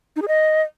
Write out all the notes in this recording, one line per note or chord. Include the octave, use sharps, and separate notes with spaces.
D#4
G#4
D#5